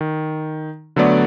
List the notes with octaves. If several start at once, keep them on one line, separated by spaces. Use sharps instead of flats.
D#3
D3 F#3 A3 B3 D5